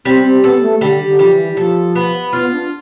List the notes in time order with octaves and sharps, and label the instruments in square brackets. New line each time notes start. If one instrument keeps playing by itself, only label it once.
[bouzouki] G3 [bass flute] C4
[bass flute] C4
[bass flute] B3 [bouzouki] A4
[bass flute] A3
[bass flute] D3 [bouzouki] G3
[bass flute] D3
[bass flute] F3 [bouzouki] G3
[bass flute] E3
[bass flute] F3 [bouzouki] A4
[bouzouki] B3
[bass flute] B3 [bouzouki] F4
[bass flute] D4